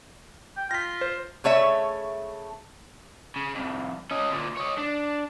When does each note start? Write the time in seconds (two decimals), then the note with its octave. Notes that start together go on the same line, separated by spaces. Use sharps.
0.57 G5
0.71 F4 A#6 B6
1.01 C5
1.44 C#3 A3 C#5 E5
3.36 C#3
3.55 C2 F2
4.11 C#4 D#5
4.30 D2 A#2
4.57 C#5 D#5
4.78 D4